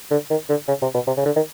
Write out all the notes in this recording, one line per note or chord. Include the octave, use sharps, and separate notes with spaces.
D3
D#3
D3
C#3
C3
B2
C3
C#3
D3
D#3